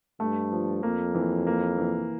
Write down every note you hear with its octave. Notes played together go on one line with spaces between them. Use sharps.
G2 A3
F3
F2 A#3
E3
A#3
E3